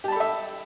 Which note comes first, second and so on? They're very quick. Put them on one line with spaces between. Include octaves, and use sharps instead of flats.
G4 A5 B5 A4 E5